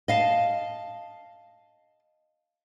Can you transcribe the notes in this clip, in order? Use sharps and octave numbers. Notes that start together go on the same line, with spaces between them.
D#5 F5 A5